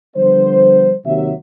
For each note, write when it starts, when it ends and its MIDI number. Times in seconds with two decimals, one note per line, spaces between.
0.16 0.92 50
0.16 0.92 53
0.16 0.92 55
0.16 0.92 59
0.16 0.92 72
1.05 1.32 39
1.05 1.32 48
1.05 1.32 54
1.05 1.32 76